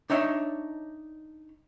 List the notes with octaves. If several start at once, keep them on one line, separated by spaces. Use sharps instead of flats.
D4 D#4 C#5 E5